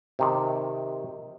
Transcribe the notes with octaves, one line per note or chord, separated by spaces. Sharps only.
C3 D#3